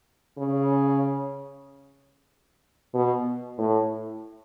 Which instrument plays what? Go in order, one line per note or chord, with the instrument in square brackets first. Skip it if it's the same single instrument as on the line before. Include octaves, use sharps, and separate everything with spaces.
[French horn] C#3
B2
A2